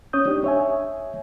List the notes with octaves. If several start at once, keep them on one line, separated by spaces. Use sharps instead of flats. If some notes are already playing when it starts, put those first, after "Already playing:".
C#4 C#5 D#6 G6
D4 D#4 G4
C#5 E5 G#5